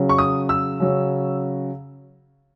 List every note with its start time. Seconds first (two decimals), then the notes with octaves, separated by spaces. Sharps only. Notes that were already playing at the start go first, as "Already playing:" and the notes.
Already playing: C#3 F#3 C#4
0.09 C#6
0.18 D#6
0.49 E6
0.80 C#3 F#3 C#4